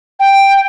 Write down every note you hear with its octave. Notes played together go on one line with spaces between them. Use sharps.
G5